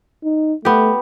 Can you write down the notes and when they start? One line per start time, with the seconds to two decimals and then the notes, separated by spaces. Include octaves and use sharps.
0.24 D#4
0.65 A3 B3 G4